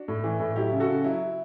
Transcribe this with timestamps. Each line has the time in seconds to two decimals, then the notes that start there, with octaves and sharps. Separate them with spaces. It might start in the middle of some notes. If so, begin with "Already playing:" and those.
Already playing: D4 F#4
0.08 A2
0.24 E3
0.40 A2
0.56 F#3 E4 G4
0.72 C#3
0.80 F#4 A4
0.89 C#3
1.04 F#3 E4